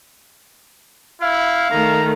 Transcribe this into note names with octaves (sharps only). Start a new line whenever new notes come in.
E4 F5
D#3 A3 A#5